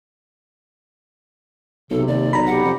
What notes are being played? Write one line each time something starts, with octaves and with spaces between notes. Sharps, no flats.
B1 C3 A4
D#2 D5
B1 A#5 B5
G4 F#5
F2